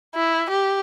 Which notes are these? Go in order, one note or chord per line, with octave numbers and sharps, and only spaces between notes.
E4
G4